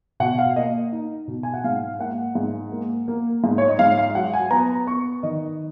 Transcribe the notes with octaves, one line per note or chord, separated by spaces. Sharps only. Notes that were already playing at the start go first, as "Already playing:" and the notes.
B2 F#5
F5
A#3 D#5
D#4
B2
G#5
F#5
G#2 F5
A#3 F#5
G#2
A#3
A#3
G#2
C#5
D#5
G#2 F5
F5
F#3 F#5
G#5
B3 A#5
B3 C#6
D#3 D#5